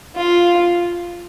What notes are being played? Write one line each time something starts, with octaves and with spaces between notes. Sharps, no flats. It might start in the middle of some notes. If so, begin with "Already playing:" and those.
F4